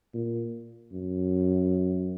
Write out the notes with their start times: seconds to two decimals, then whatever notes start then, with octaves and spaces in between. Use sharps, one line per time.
0.14 A#2
0.92 F#2